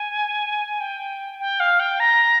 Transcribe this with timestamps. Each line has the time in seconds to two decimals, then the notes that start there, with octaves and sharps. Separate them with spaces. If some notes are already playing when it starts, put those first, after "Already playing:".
Already playing: G#5
0.80 G5
1.40 G5
1.60 F5
1.80 G5
2.00 A#5